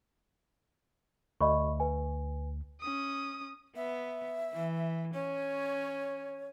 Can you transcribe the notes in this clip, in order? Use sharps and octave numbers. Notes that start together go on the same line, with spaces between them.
D2 D#5 B5 C#6
B4 G#5
C#4 D#6
B3 E5
E3
C#4 C#5